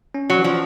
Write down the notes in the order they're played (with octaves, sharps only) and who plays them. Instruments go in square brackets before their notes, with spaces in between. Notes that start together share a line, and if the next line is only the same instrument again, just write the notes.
[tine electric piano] C#4
[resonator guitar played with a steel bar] F#3
[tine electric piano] E3
[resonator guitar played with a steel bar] F3